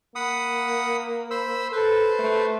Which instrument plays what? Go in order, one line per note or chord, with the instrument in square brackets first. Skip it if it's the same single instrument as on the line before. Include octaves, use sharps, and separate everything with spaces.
[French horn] A#3 [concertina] F#5 B5 D#6
[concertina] C5 B5 E6
[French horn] A4 [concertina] B4 C5
[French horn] A3